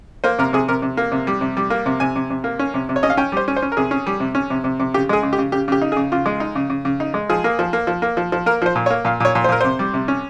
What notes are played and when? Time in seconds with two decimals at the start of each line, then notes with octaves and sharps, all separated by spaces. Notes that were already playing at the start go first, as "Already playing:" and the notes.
0.24 A#3 C5
0.39 C3 A#4
0.53 C3 G#4
0.68 C3 A#4
0.82 C3
0.97 A#3
1.12 C3
1.27 G3
1.41 C3
1.57 G3
1.70 A#3
1.86 C3
2.00 C3 G#5
2.16 C3
2.30 C3
2.44 A#3
2.59 C#4
2.74 C3
2.89 C3
2.96 C#5
3.03 C#4 D#5
3.10 F5
3.17 C#4 G5
3.32 G3 C5
3.48 C#4
3.57 C5
3.62 C#4
3.72 A#4
3.77 C3 G#4
3.91 C#4
4.06 G3
4.20 C3
4.35 C#4
4.50 C3
4.64 C3
4.80 C3
4.94 C#3 G4
5.09 G#3 G#4
5.23 C#3
5.33 G4
5.38 C#3
5.52 C#3 G4
5.68 C#3 G4
5.82 D#4
5.92 G#4
5.96 C#3
6.12 C#3 F4
6.26 G#3
6.40 D#4
6.55 C#3
6.70 C#3
6.85 C#3
7.00 D#4
7.14 G#3
7.30 F3 G#4
7.44 A#3
7.59 F3
7.73 A#3
7.87 F3
8.02 A#3
8.17 F3
8.32 F3
8.46 A#3 A#4
8.62 F3 C5
8.75 A#2
8.86 C#5
8.90 A#3
9.05 A#2 F5
9.20 A#2 C#5
9.35 A#2
9.44 C5
9.49 A#2 A#4
9.61 C3 C5
9.79 G3
9.94 C3
10.08 C#4